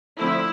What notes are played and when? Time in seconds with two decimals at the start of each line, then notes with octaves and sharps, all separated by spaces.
0.19 D3 F3 A3 C4 E4